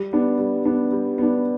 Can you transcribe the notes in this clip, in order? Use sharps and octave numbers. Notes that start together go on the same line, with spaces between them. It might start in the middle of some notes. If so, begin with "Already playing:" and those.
Already playing: G3
B3 D4
G3
B3 D4
G3
B3 D4